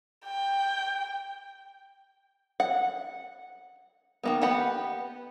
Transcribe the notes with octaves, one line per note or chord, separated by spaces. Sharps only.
G5
F#5
D#3 A#3 B3
B3 G4 F#5 B5